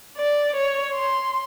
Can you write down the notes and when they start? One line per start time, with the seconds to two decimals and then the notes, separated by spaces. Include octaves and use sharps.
0.17 D5
0.57 C#5
0.94 C6